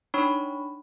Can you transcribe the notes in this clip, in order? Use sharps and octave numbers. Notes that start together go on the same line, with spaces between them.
D4 D#4 C#5 B5 C#6